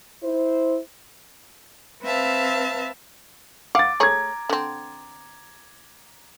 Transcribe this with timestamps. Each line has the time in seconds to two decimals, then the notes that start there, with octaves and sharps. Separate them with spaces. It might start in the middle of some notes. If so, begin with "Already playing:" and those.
0.23 E4 C5
2.03 C4 B4 E5 F5 A5
3.75 F5 F#5 D6 A6
4.00 A3 G#4 C#5 A#5 G#6
4.49 D3 C4